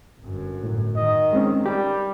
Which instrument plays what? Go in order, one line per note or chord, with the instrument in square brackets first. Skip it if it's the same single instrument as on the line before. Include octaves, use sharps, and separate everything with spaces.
[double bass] G1 F#2
[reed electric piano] A2
[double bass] D#3 [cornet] D#5
[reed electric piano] G#3 C4 C#4
[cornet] G3 [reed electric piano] G4